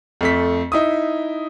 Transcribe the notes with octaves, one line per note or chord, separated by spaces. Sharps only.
F2 A3 B6
D#4 E4 D#6